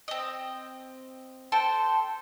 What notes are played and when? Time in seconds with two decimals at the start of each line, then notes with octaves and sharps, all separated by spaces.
0.08 C4 D#5
1.52 A4 C5 G5 A5